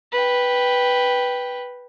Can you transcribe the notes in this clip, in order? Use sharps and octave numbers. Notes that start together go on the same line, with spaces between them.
B4 G5